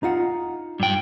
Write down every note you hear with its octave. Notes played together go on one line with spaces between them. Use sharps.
D#4 F4 F#5
G2 G5